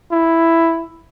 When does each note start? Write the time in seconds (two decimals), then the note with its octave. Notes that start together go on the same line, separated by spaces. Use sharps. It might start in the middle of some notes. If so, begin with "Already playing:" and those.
0.12 E4